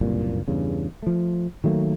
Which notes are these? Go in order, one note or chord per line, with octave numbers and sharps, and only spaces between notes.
F#1 C2 G2 A#2
E2 G2 C#3
F3 A3
D#3 F#3 A3 A#3